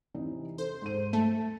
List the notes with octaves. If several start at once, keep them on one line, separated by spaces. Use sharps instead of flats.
C3 E3 D#4
A4 C5
G#2 D#7
A3 A5